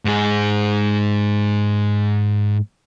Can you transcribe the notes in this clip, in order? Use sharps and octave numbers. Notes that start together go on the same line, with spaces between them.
G#2 G#4